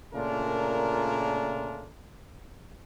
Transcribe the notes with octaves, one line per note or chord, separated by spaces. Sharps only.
A#2 C#3 A3 D4 F4 A#4